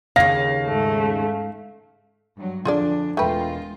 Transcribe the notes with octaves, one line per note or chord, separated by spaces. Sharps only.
D#2 C#3 F5 A#6
G#2 A3
G2 F#3
F2 D3 D4 F4 G#4 D5
E1 G#3 A3 F4 B4 G5